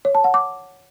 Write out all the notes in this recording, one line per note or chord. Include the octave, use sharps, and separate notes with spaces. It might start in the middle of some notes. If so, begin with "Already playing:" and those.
C#5
A5
F#5
D6